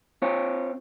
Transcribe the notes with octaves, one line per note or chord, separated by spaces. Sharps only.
C4 F4 C#5